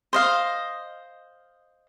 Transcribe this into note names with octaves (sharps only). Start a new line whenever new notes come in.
C5 D#5 F5